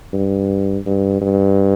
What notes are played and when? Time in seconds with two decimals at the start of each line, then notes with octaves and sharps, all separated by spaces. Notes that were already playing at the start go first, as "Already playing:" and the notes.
0.13 G2
0.86 G2
1.22 G2